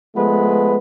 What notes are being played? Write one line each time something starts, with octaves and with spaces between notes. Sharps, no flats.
F3 G#3 A3 B3 B4